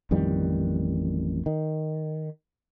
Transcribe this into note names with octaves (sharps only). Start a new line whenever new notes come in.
A1 F2 D#3 G3
D#3